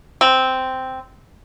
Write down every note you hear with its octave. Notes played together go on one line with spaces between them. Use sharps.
C4